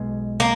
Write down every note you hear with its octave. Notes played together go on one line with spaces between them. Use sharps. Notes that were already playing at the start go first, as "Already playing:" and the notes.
Already playing: B1 B2 G#3
A#3